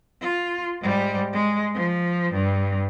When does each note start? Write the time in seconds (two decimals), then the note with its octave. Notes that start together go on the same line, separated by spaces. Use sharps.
0.21 F4
0.82 G#2 G3
1.33 G#3
1.74 F3
2.33 G2